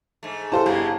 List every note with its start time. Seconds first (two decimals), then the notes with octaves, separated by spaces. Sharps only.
0.23 G#2 A3
0.52 E4 G4 A4 C5 F5 A5
0.66 G1 C#3 G#3